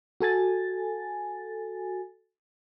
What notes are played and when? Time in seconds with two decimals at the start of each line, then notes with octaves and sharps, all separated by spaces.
0.21 F#4 A4 G#5 A6